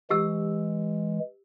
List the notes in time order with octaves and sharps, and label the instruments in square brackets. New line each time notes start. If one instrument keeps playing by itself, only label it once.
[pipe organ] E3 G#3 [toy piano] G4 E6